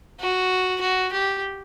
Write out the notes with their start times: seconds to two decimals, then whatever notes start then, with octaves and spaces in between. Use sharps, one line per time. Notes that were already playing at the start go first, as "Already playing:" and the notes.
0.20 F#4
0.81 F#4
1.12 G4